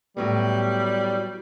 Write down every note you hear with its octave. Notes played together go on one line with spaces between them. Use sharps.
A2 F#3 G3 B3